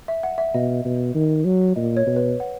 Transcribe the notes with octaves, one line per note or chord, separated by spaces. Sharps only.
E5
F#5
E5
B2 D#5
B2
D#3
F#3
A#2 D#5
C#5
B2
B4
F#5